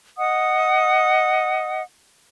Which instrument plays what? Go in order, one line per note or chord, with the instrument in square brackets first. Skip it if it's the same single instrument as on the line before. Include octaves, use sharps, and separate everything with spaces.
[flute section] D#5 F#5 D#6